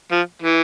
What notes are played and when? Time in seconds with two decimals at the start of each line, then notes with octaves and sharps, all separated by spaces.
0.11 F3
0.42 E3